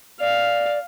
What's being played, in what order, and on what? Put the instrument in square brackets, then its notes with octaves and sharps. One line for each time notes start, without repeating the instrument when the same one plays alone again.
[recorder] D5 [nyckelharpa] F5